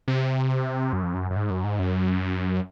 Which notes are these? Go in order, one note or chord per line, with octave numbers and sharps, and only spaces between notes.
C3
F#2
F2
F#2
F#2
G#2
F#2
G#2
F#2